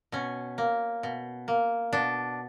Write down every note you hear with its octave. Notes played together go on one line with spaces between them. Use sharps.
B2 C#4
A#3
B2
A#3
B2 D4